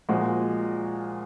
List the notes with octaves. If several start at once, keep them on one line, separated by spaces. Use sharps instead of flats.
A#2 F3 G#3 F#4